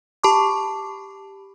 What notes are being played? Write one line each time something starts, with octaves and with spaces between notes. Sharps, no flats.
G4 A5 B5 C#6 D6